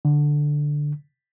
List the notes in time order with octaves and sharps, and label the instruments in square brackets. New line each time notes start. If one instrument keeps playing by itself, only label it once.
[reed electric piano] D3